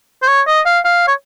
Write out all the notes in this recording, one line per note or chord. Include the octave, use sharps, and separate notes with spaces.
C5
C#5
D#5
F5
F5
C#5